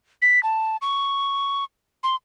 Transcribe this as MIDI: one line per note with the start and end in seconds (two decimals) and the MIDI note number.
0.22 0.42 95
0.43 0.77 81
0.82 1.64 85
2.04 2.16 84